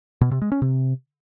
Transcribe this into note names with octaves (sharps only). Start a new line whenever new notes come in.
B2
C3
G#3
C#4
C3